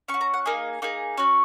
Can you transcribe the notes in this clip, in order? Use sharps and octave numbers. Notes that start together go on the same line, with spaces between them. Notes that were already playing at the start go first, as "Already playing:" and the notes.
C#4 C#6
F#4
A#5
F#5
A#3 D#4 G#4 D#5
A#3 D#4 G#4
C#4 F#4 C#5